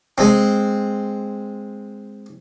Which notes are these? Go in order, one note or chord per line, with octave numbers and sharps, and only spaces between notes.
G#3 C4